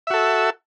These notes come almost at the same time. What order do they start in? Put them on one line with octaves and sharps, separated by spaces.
E5 F#4 A4